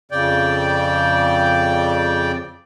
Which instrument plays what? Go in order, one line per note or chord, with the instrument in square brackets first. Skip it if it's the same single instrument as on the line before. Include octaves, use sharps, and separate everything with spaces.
[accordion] F2 C#3 D5 G5